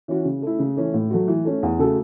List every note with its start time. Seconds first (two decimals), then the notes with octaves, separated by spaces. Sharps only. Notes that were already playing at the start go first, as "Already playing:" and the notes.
0.08 E3 C#4 F#4
0.25 C#3
0.42 A3 E4
0.59 C#3
0.77 E3 A3 C#4
0.94 A2
1.10 F#3 A3 F#4
1.28 E3
1.45 A3 C#4
1.63 E2
1.79 C#3 A3 F#4 A4